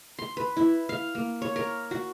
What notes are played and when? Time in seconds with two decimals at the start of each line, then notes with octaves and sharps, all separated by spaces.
0.19 C6
0.37 B4
0.57 E4
0.89 F5
1.15 A#3
1.42 C#5
1.56 A#4
1.91 F#4